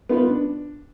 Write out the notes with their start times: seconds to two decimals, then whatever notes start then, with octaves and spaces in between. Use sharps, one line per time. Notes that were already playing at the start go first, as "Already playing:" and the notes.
0.09 B3 D#4 F4 B4
0.29 D4